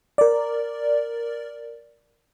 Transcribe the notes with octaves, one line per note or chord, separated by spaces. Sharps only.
A#4 D5